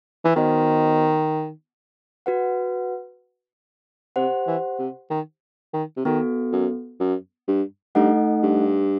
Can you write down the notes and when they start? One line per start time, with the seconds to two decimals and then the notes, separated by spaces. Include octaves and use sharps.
0.25 E3
0.36 D#3 B3 F#4 C5 D#5
2.26 F#4 B4 F#5
4.16 C3 G4 C5 F#5
4.47 E3
4.79 C3
5.10 D#3
5.73 D#3
5.97 C3
6.05 D#3 B3 F#4 A4
6.52 F#2
7.00 F#2
7.48 G2
7.95 G2 A3 D#4 A4 D#5 F#5
8.43 G2